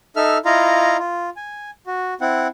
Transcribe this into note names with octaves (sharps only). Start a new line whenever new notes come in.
D#4 A4 E5 F6
E4 F4 D#5 F5 A#5
F4
G#5
F#4
C4 E4 F#5